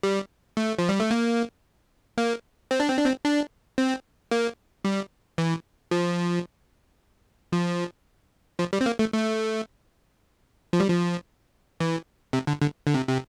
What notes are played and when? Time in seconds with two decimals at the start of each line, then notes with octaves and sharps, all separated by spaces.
0.03 G3
0.57 A3
0.79 F3
0.89 G3
1.00 A3
1.11 A#3
2.18 A#3
2.71 C4
2.80 D4
2.89 C4
2.97 D4
3.06 C4
3.25 D4
3.78 C4
4.31 A#3
4.85 G3
5.38 E3
5.91 F3
7.52 F3
8.59 F3
8.73 G3
8.81 C4
8.86 A#3
8.99 A3
9.13 A3
10.73 F3
10.80 G3
10.88 F3
11.80 E3
12.33 C3
12.47 D3
12.61 D3
12.87 D3
12.94 C3
13.08 C3